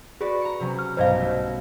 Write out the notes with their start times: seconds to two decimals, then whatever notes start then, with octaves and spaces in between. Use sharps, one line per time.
0.21 F#4 G#4 B4 D5
0.41 A#5 C#7
0.60 C3 F#3 C#4
0.79 F6
0.97 B1 G2 G3 C5 D#5 F5
1.20 A3